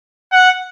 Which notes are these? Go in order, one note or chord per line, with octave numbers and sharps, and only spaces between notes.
F#5